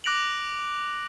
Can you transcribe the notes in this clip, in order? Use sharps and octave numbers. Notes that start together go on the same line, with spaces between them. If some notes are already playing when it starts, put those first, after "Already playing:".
D6 F#6 A#6 D7 F7 F#7